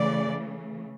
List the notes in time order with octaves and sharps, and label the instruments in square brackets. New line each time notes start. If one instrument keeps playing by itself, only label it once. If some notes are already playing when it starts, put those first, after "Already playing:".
Already playing: [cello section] C#3 E3 A3 D5